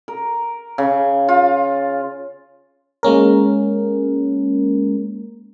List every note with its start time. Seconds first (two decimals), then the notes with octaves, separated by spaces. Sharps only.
0.08 A#4
0.78 C#3
1.29 F4
3.03 G#3 A#3 C#4 A#4